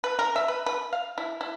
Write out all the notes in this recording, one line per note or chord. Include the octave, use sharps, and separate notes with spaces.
B4
A#4
E5
B4
B4
F5
E4
E4